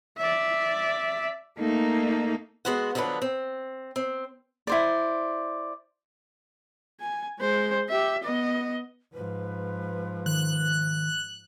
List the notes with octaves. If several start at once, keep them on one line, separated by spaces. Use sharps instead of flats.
D5 E5
A3 A#3 D#4
G#3 B3 F#4 C5 F#5
D3 F3 F#3 B3 B4
C4
C4
E4 C5 D5
G#5
G#3 C5
G4 E5
B3 D#5
G#2 F3 B4
D#3 F#6